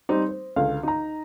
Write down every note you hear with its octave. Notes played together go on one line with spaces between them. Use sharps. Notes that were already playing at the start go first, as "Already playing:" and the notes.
G3 C4 D#4
C5
C#2 D3 F5
D#4 A#5